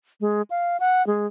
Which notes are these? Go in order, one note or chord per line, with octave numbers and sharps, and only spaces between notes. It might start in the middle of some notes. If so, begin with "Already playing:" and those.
G#3
F5
F#5
G#3